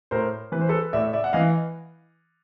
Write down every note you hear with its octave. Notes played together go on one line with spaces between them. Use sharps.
A2 A#4 C5
E3 B4
C5
A4 B4
A2 D5 E5
D5 E5
F#5
E3 D#5 F5